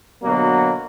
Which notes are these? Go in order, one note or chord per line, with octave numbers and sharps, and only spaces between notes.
B2 D3 F#3 A#3 B3